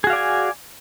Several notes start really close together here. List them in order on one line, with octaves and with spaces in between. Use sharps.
G#4 F#4 F5 D5 G#5